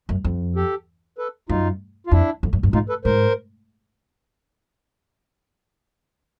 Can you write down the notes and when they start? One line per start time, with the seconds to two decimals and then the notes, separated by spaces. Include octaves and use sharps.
0.09 F#2
0.25 F2
0.56 G4 A4
1.18 A4 B4
1.49 F#2 D#4 F4
2.07 F4
2.11 F2 D4 E4
2.43 F2
2.53 F#2
2.63 G2
2.73 G#2 D#4 F4
2.89 A4 B4
3.05 G#2 A#4 C5